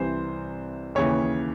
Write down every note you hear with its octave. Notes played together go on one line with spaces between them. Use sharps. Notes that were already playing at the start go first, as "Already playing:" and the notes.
Already playing: C2 C3 E3 C5
D#2 C#3 E3 C#5